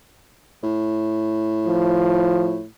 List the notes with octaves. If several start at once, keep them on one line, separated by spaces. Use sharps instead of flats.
A2
F3